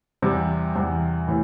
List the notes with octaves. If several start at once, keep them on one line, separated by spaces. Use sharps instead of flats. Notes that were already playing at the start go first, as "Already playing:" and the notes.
E2 C3 G3
E2 C3 G3
A2 E3